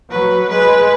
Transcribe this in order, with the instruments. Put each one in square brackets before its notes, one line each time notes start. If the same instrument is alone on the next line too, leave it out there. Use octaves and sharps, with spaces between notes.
[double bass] F#3 [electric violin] B4
[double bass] G#3 [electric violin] B4